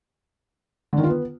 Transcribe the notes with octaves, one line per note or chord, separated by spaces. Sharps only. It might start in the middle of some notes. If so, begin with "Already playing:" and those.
D3
D#3
F4
B3